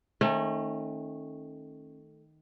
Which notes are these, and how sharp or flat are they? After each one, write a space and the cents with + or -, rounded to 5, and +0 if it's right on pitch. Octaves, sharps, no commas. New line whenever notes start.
D#3 +0 A3 +0 C#4 -40